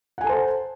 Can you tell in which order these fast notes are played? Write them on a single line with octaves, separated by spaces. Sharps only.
F#5 G#5 A4 A5 C5